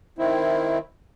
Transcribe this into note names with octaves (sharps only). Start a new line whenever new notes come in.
D#3 C4 E4